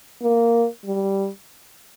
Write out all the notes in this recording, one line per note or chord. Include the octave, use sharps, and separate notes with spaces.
A#3
G3